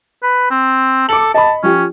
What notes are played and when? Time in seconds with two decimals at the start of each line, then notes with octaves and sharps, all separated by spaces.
0.23 B4
0.51 C4
1.09 A4 D6 C#7 F#7
1.34 D#5 A5 B5
1.63 F3 C#4 G4